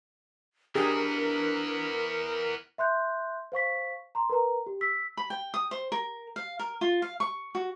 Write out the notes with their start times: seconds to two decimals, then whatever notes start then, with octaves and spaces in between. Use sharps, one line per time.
0.75 E3 B3 D4 G4 G#4 A#4
2.78 E5 C6 F#6 G6
3.52 C5 F5 C#6 B6
4.15 A#5 C6
4.30 A#4 B4 A#5
4.66 G4
4.81 E6 B6
5.17 B5
5.30 G5
5.54 D#6
5.71 C5
5.92 A#4
6.36 F5
6.59 A#4
6.81 F4
7.02 F5
7.20 C#6
7.55 F#4